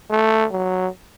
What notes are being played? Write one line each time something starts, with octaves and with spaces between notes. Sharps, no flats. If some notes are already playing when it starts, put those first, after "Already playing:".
A3
F#3